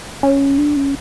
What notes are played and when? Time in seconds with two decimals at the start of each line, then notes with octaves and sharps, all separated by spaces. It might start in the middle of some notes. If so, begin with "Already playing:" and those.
0.23 C#4
0.58 D4
0.76 C#4